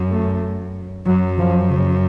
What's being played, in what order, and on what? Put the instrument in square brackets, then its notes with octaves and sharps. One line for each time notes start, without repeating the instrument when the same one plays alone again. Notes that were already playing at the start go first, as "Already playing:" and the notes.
Already playing: [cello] F#2
[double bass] A3
[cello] F#2 [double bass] F#3
[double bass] F3
C#3